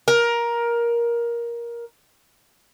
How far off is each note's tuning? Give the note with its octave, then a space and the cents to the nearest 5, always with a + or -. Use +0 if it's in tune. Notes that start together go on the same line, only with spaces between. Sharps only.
A#4 +15